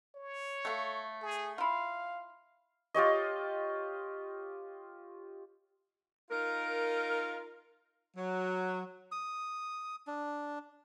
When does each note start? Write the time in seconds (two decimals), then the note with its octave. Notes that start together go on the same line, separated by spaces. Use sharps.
0.15 C#5
0.65 A3 F5
1.22 G#4
1.58 E4 F4 F5
2.94 F4 G4 C#5 D#5
6.30 D#4 F4 A#4
8.16 F#3
9.12 D#6
10.07 D4